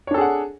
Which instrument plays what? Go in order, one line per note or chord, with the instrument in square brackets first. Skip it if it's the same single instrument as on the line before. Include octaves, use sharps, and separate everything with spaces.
[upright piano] C#5
D4
A4
G#4
F#5